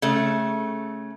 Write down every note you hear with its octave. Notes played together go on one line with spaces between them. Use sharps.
C#3 A3